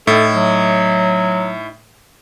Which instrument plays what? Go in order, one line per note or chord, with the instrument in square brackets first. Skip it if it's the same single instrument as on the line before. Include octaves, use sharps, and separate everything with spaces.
[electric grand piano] A2 [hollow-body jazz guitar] D#4 E4 [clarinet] A4
[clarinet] F#3